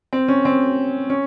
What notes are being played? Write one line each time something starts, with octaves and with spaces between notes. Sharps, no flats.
C4
C#4
C4
C#4